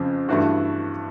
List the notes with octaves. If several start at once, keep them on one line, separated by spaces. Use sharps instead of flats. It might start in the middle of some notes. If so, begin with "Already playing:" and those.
Already playing: F2 C#3 F3
G2 E3 A3 D4 F#4